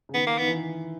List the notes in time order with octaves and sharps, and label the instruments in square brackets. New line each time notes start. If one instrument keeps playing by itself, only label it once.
[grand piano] C#3
[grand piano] D#3 [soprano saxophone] B3
[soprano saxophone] A#3
[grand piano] D#3 [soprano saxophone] B3
[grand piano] E3